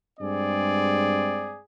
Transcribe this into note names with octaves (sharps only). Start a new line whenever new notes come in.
G2 G#3 C4 G#4 D5